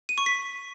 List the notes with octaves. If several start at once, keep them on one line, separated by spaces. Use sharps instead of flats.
D#7
C#6
B6